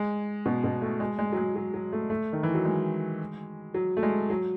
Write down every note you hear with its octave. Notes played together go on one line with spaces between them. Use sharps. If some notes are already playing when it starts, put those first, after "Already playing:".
Already playing: G#3
B2
B2
A3
G#3
G#3
F#3
G#3
F#3
F#3
A3
A3
D#3
E3
F#3
G#3
F#3
A3
G#3
F#3